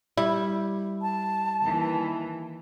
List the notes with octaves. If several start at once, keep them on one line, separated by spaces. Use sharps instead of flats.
G3 E4
A5
D#2 E3